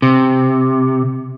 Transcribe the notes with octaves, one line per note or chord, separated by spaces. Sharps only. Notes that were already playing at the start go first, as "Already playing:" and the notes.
C3